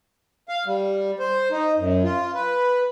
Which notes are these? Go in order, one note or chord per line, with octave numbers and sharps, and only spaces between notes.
F5
G3
C5
D#4
F#2
F4
B4